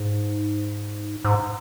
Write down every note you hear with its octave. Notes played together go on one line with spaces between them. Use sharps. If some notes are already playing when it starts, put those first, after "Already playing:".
Already playing: G#2
G#2